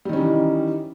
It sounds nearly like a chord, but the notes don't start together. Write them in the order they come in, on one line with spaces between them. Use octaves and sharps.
G3 D#3 C#4 D#4 E3